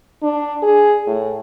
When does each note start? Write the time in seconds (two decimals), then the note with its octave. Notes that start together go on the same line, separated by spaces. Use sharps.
0.23 D4
0.62 G#4
1.07 A2